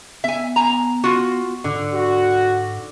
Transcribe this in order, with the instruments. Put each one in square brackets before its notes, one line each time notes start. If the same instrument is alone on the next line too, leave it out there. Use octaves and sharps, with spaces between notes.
[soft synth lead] B3 [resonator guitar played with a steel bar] E5 G#5
[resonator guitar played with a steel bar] G#5 A#5
F4 F#4
[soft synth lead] G#2 [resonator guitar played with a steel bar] D3
[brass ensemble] F#4